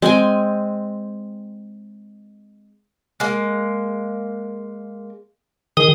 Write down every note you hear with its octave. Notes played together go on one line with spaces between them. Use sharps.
G#3 C4 G5 G#5
G#3 A#3
D#3 G#4 D#6